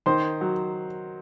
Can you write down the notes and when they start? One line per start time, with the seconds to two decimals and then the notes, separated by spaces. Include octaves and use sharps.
0.06 D#3 C5 C6
0.41 F#3